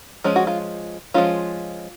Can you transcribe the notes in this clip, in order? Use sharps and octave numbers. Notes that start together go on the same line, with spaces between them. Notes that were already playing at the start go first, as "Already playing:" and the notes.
F3 G#3 C#4
F#4
F4
F3 G#3 C#4 F4